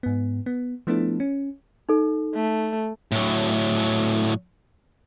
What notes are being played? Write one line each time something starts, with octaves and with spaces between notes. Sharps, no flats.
G#2 B3
B3
F3 A3 B3 D4 E4 A4
C#4
D#4 A4
A3
A2 F#3